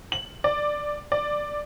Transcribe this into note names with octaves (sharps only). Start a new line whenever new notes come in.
F#7
D5
D5